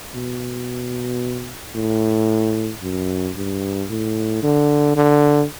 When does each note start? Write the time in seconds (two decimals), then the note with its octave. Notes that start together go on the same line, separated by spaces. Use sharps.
0.15 B2
1.76 A2
2.83 F#2
3.36 G2
3.90 A2
4.43 D3
4.96 D3